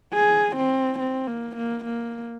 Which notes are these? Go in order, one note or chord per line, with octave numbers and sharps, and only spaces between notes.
G#4
C4
C4
A#3
A#3
A#3